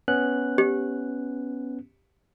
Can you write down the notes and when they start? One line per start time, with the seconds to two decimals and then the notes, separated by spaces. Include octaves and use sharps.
0.08 B3 C#4 F#6
0.58 G4